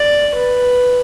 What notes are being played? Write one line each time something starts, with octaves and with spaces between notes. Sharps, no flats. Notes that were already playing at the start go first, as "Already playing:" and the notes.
Already playing: D5
B4